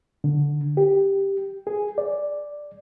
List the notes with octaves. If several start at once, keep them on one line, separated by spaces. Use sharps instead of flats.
D3
G4
G#4
D5